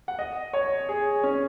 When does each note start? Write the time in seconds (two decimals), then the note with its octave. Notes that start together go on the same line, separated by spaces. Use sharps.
0.08 F#5
0.19 D#5
0.53 C#5
0.89 G#4
1.23 C#4